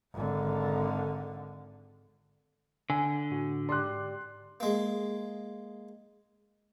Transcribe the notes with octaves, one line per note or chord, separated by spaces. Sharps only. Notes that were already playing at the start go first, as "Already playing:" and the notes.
G#1 D3
D3 G#5
A2 F#4
G#2 G4 D5 C6 D6 F#6
G#3 A#3